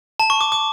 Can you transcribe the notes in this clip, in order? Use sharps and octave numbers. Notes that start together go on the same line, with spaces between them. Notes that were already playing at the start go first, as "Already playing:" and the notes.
A5
C#6
D6
D6